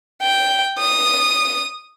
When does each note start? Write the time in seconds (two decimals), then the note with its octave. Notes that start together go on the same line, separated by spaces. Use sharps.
0.22 G5
0.79 D#6